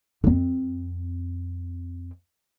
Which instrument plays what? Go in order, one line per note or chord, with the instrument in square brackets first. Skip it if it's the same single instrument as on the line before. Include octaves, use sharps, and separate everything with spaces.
[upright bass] F2 C4